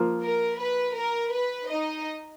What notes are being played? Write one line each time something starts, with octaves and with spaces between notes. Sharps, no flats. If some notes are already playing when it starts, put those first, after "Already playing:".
Already playing: F3 A#3 F4
A#4
B4
A#4
B4
D#4 D#5